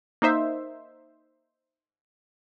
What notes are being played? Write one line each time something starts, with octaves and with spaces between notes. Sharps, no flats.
A#3 D#4 C5 E5